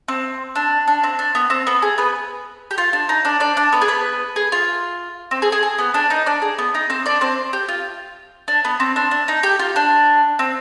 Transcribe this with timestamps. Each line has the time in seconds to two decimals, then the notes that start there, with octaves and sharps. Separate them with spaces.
0.08 C4
0.55 D4
0.88 D4
1.03 C4
1.19 D4
1.35 B3
1.50 C4
1.67 B3 B4
1.82 G#4
1.98 B3 B4
2.71 G4
2.78 F4
2.93 D4
3.09 D#4
3.25 D4 D5
3.40 D4 D5
3.57 D4 D5
3.72 B3 B4
3.81 G#4
3.88 B3 B4
4.36 G#4
4.52 F4
5.31 C4
5.42 G#4
5.52 G#4
5.63 G#4
5.78 B3 B4
5.94 D4 D5
6.10 D#4 D#5
6.26 D4 D5
6.42 G#4
6.58 B3
6.75 D#4
6.90 C4 C5
7.06 D4 D5
7.21 C4 C5
7.53 G4
7.68 F4
8.48 D4
8.65 B3
8.80 C4
8.96 D4
9.11 D4
9.28 D#4
9.43 G4
9.59 F4
9.76 D4
10.39 C4